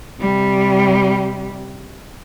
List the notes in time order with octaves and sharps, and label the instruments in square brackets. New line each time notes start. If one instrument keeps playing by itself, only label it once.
[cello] C3 G3